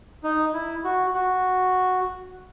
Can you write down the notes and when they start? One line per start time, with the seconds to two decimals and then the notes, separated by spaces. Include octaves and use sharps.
0.24 D#4
0.54 E4
0.84 F#4
1.14 F#4